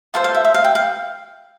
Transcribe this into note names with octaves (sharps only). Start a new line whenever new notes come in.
F4 A4 C5 F5
F5
E5
E5
F5
G5
F5